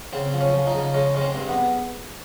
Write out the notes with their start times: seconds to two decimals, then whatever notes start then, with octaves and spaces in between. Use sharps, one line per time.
0.13 C#3 C4
0.34 F3
0.41 C#4
0.54 F3
0.67 D#4
0.74 C#3
0.94 G#3 C#4
1.15 G#3 C#4
1.21 C4
1.35 G2
1.49 B3